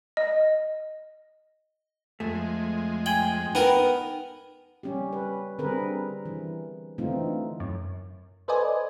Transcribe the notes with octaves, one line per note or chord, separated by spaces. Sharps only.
D#5
F2 G#3 A3
G5 G#5 G#6 F#7
B3 D#4 A#4 G5 D#7
G3 C#4 G4
B4
D3 G3 C4 G#4 A#4 B4
E3
D3 E3 A3 C4 D#4 F4
F#2
A4 B4 C5 D5 D#5 G#5